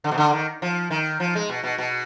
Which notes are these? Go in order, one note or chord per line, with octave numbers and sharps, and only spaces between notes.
D3
B2
D3
D#3
F3
D#3
F3
G#3
B2
B2
B2